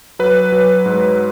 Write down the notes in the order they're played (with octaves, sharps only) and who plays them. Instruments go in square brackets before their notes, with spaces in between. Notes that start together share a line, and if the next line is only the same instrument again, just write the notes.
[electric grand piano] F#3 B4
F#3
G#2